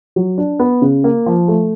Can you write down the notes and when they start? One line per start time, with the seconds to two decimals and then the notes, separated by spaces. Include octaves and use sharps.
0.16 F#3
0.38 D4
0.59 B3
0.82 C#3
1.04 A#3
1.26 F3
1.48 A3